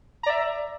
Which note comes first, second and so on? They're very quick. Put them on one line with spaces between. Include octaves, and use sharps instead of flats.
A#5 D5 E5